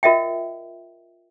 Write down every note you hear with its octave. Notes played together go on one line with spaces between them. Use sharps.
F4 A#4 D#5 E5 G5